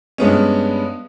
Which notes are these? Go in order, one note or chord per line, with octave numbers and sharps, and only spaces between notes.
G2 G#3 B3 C#4